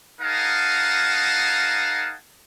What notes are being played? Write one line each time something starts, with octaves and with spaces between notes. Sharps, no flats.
D#4 G#4 A#4 F5 F#5 A5